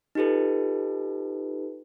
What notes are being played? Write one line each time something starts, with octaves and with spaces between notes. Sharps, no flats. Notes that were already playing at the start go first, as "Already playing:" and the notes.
D#4 F4 G4 A4 B4